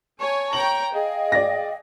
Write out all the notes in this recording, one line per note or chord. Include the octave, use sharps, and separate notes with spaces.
C#5 G#5 A5 C#6
C#5 G5 A#5 F#7
G#4 D#5 F5 G5
D5 A#6